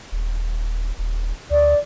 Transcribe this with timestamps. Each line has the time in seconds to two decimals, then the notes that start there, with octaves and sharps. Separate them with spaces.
0.12 D#1
0.99 D#1
1.50 D2 D5